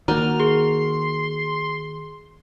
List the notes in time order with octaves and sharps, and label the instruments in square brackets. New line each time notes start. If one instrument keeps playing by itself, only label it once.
[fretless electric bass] D#3 A#3 [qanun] F#4 D5 G5 [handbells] A#5 [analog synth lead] F6
[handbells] G#4 [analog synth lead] C6